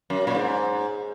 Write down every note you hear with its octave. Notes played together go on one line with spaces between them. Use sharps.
F#2
A#2
G#2